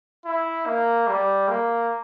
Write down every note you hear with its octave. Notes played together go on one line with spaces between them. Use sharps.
E4
A#3
G3
A#3